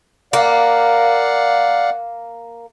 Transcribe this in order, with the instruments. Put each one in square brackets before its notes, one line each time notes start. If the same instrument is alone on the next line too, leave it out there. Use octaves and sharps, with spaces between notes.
[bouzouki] A#3 [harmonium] D5 F5 F#5